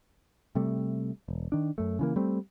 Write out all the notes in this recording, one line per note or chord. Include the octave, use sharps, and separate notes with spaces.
C3 G3 A3
E1
D#3 D4
F#2 A3
C#3 E3 A#3
G3 A3 C4